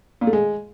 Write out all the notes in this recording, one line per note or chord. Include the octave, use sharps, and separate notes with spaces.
A#2
A3
G#3